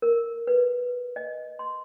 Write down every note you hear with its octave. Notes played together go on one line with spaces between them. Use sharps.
A#4
B4
D#5
C6